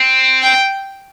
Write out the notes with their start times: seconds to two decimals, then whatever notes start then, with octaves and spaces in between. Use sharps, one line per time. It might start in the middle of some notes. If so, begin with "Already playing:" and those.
Already playing: C4
0.42 G5